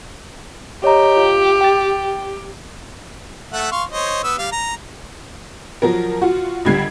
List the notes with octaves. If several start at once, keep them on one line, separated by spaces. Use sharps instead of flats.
G4 C#5 D#5 A#5
F4
G5 A6
A3 E5 F#5
F5 C6 C#6
C5 C#5 D#5
B3 E6
G3 F5
A#5
F3 F#3 A#4
F4 F#4
C#2 D3 G3 G#6 C7